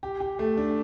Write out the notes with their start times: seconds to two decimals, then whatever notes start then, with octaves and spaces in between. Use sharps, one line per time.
0.03 G4
0.20 G4
0.39 A3
0.57 D4